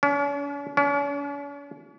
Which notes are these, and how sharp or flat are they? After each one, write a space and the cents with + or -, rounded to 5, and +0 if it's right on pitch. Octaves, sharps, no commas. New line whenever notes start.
C#4 +45
C#4 +45